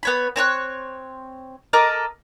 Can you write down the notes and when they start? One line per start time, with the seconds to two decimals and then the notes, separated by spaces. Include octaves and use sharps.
0.03 B3 C#5 B5
0.36 C4 C#5 A5 F#6
1.73 A4 A#4 D#5 D6